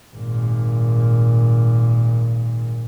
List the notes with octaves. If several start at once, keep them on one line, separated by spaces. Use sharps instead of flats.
G#1 A#2